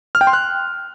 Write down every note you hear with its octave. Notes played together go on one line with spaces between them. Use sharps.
F6
G5
C6
F#6